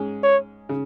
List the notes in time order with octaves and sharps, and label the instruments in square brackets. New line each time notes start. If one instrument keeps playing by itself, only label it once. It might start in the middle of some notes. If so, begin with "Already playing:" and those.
Already playing: [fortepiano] G#2 G#3 C#4 G#4
[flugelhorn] C#5
[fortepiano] C#3